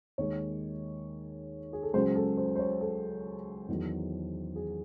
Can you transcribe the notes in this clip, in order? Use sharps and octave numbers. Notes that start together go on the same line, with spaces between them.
D#2 D#3 G#3 C#5
G#4
A4
C#2 C#3 F#3 C#4 C5
A4
C5
C5
C#5
A4
E2 D#3 F#3
G#4